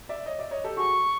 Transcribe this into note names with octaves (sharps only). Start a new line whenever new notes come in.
D5 E5
C#5 D#5
D5 E5
C#5 D#5
G4 A4
F#4 G#4 C#6